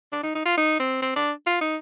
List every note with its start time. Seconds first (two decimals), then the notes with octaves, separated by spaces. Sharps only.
0.12 D4
0.23 D#4
0.35 D#4
0.45 F4
0.57 D#4
0.79 C4
1.02 C4
1.16 D4
1.46 F4
1.61 D#4